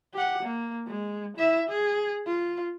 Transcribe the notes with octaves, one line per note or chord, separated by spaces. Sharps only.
G4 F#5
A#3
G#3
E4 E5
G#4
F4